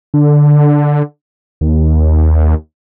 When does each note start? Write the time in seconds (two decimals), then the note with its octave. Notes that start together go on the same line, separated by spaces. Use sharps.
0.14 D3
1.61 D#2